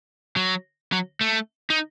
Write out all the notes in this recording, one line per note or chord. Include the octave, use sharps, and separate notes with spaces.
F#3
F#3
A3
D#4